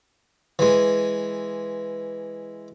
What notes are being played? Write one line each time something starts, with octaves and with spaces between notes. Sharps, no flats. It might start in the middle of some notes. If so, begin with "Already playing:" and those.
E3 G#3